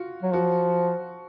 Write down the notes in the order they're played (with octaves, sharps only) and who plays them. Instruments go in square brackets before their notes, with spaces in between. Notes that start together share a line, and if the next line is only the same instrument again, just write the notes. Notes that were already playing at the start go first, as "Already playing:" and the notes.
Already playing: [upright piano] F4 F#4
[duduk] F#3
[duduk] F3 [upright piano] F#4